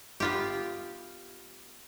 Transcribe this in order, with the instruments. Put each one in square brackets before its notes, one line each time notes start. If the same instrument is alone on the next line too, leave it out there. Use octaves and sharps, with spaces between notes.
[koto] B3 F4 G4